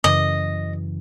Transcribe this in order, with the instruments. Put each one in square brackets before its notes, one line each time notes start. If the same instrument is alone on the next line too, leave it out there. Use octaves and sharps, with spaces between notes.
[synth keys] F#2 C#3 E3 [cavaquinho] D#5